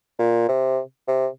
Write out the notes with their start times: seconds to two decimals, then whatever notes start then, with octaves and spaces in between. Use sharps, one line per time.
0.19 A#2
0.48 C3
1.08 C3